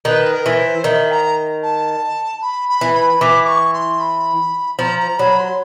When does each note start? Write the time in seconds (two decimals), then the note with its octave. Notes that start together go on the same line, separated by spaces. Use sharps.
0.05 D#3 B4
0.32 A#4
0.46 E3
0.59 C5
0.84 D#3 E5
1.11 A#5
1.63 A5
2.42 B5
2.69 B5
2.81 E3
2.94 B5
3.21 E3 D6
3.43 D6
3.48 C#6
3.73 C6
4.00 B5
4.79 F3 A#5
4.99 A#5
5.18 F#3 B5
5.39 C6